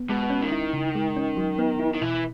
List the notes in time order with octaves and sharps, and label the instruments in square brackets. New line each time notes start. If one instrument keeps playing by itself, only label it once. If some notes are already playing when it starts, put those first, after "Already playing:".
Already playing: [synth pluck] B3
[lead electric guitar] B2 [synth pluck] G#3
[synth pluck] C#4
[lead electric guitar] D#3
[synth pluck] E4
C#3
G#3
C#4
F#3
B3
E4
[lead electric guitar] D#3
[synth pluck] B2 [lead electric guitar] E3